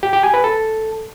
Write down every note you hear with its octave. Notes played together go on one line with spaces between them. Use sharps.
G4
G4
G#5
B4
A4